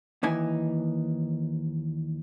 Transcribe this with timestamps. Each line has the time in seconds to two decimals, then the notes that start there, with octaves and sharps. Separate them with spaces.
0.23 D#2 E3 D#4 G#5